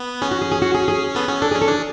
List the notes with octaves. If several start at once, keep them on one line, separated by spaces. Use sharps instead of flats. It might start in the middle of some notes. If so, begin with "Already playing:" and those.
Already playing: B3
C#4 G#4
F#4
G#4
G#4
F#4
G#4
G#4
B3 A4
C#4 G#4
D4 A4
C#4 G#4
A4
D4 G#4